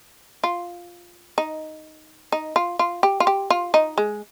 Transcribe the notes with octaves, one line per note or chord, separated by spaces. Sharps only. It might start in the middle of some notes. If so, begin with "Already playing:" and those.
F4
D#4
D#4
F4
F4
G4
F4
G4
F4
D#4
G#3